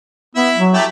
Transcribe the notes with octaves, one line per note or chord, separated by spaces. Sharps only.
B3 E4 E5
F#3
A3 E4 G4